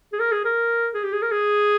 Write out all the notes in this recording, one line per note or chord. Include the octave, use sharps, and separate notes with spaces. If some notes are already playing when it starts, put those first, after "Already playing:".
G#4
A#4
G#4
A#4
G#4
G4
G#4
A#4
G#4